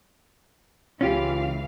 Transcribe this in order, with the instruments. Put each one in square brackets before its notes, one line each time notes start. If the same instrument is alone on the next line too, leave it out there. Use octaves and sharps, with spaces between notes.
[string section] C#2 E3 F5 [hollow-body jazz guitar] C#4 F4 G4